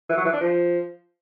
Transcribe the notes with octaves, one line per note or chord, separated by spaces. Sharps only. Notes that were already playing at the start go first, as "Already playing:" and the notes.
E3
F#3
E3
D4
F3